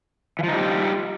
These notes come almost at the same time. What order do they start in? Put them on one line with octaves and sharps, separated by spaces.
E3 F3 D#4 G3 G4